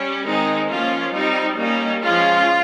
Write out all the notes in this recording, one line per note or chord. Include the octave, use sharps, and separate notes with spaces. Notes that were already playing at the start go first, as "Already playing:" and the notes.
Already playing: G3 C#4
D#3 G#3 C4 D#4
F3 A#3 C#4 F4
G3 C4 D#4
G3 A#3 C#4 D#4
F3 G#3 C#4 F4